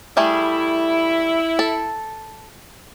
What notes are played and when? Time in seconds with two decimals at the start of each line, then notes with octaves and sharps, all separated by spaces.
0.17 G3 A3 E4 G#4
1.59 A4